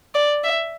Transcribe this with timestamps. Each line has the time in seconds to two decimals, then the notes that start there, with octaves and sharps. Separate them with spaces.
0.14 D5
0.43 E5